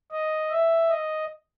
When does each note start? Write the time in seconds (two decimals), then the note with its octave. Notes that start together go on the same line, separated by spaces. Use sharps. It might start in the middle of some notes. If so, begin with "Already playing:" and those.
0.12 D#5
0.50 E5
0.89 D#5